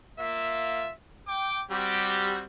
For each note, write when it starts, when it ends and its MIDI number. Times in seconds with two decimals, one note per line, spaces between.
0.20 0.91 58
0.20 0.91 65
0.20 0.91 76
1.28 1.62 79
1.28 1.62 86
1.71 2.42 55
1.71 2.42 60
1.71 2.42 66
1.71 2.35 67